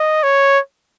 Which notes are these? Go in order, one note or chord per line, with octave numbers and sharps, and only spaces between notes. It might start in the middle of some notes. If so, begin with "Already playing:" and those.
Already playing: D#5
C#5